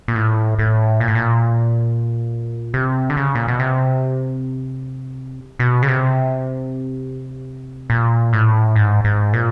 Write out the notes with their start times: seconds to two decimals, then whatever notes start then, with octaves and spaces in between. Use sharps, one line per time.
0.08 A#2
0.16 A2
0.59 A2
1.00 A#2
1.08 A2
1.15 A#2
2.74 C3
3.10 D3
3.17 C#3
3.35 A#2
3.48 B2
3.60 C3
5.59 B2
5.83 C#3
5.88 C3
7.90 A#2
8.33 A2
8.76 G#2
9.04 G#2
9.33 A#2